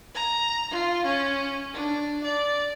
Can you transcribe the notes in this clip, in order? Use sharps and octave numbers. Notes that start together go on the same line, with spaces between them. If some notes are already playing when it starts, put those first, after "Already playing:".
A#5
F4
C#4
D4
D5